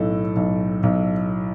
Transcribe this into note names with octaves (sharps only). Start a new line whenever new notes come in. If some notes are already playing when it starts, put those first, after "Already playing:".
Already playing: B1 A2 A4
B1
B1